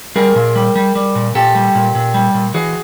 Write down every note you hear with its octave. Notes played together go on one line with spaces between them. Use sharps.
G3 G#4 A#4
A#2
G3
G3
G3
A#2
A#2 G4 A4
G3
A#2
A#2
G3
A#2
E3 F#4 G#4